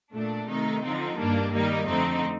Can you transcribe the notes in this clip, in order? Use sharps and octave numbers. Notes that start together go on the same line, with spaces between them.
A#2 A3 D4
C3 D#3 A3 D#4
D3 F3 C4 D#4
G2 D#3 G3 A#3 D4
D#3 G3 A#3 D#4
F2 D3 A3 C4 D#4